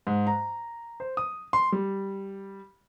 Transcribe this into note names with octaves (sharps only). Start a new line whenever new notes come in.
G#2
A#5
C5
D#6
C6
G3